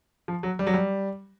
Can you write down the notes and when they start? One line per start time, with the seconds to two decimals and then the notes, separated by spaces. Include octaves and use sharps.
0.28 F3
0.43 F#3
0.59 G3
0.67 F#3
0.74 G3